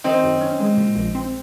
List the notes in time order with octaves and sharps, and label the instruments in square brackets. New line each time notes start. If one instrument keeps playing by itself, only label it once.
[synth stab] D#3 [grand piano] C4 D#4
[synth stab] F#2
C#4
G#3
A#2
A#1
C4